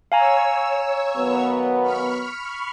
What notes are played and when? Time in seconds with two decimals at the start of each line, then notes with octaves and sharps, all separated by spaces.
0.12 C#5 F5 G#5 A#5 E6
1.17 D#3 F#3 B3
1.82 B5 C#6 F6